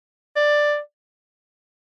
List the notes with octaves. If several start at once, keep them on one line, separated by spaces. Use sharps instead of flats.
D5